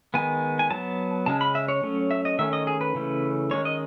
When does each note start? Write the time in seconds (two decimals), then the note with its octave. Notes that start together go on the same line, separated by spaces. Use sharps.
0.14 D#3 G#3 B3 G#5
0.59 G#5
0.70 F#3 B3 A5
1.26 C#3 G#3 C#4 A5
1.41 B5
1.55 E5
1.68 C#5
1.83 F#3 A3 C#4
2.11 E5
2.25 D#5
2.39 D#3 A3 C#4 E5
2.53 D#5
2.67 G#4
2.81 B4
2.95 C#3 E3 A3 C#4
3.51 D#3 G#3 C#4 C#5
3.65 D#5